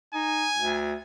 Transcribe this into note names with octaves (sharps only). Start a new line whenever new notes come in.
D#4 G#5
D2